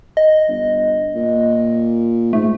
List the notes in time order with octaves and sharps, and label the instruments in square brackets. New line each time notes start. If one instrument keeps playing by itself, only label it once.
[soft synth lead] D#5
[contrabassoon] G1
A#2
[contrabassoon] G#2 [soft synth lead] A3